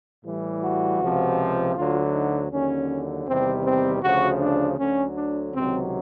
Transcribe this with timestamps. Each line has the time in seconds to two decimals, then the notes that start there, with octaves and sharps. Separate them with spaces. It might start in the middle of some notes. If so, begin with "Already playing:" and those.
0.24 A2 E3 G3
0.62 F#4
1.00 C#2 C3 F3
1.76 D2 D3 F#3 F4
2.13 D#4
2.51 D#2 D3 F#3 C#4
3.27 E2 C3 D#3 G3 C4
3.65 C4
4.02 D2 C#3 F3 F#4
4.40 D4
4.78 D2 D3 F#3 C#4
5.16 D4
5.54 C#2 C3 D#3 F#3 C4